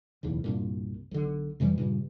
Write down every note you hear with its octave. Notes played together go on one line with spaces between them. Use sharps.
D1 B1 E2 C#3
C2 G2 A#2
B1 D3
F2 C3 E3 G3
G2 A#2 C#3